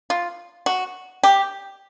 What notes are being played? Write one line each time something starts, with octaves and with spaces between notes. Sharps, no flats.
F4
F#4
G4